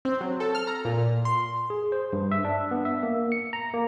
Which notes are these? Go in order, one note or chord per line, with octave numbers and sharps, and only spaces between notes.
C4
F#3
A4
F6
A#5
A#2
C6
G#4
C5
G2
E5
D4
B3
E5
A#3
C#7
A#5
A#3